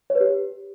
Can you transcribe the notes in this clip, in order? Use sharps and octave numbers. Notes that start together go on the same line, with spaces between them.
C#5
B4
G4